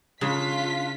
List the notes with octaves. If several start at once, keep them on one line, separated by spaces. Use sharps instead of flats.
C#3 G#3 D4 F4 B6